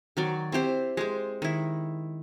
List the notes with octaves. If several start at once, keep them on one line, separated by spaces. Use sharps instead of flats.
D#3 F#3 D5
C4 E4 G4 C5
G#3 G4 C5
D#3 E4